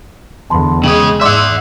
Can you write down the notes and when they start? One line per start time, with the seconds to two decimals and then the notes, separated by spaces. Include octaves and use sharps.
0.50 E2 D3 A5 B5 C6
0.84 C#3 G#3 G#4 G5 F#7
1.21 G#2 D5 E5 F#5 C6 D6